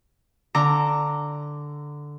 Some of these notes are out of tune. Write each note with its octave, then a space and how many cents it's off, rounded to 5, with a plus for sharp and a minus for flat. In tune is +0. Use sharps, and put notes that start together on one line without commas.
D3 +0 A#5 -15 D6 +0